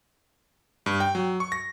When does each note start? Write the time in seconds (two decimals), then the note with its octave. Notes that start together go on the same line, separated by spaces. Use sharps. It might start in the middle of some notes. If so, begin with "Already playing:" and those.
0.86 G2
1.00 G5
1.15 F#3
1.40 C#6
1.52 A#6